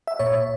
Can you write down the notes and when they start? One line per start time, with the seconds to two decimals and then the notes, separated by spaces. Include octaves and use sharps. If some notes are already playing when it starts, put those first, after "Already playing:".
0.07 E5
0.19 A#2 C#5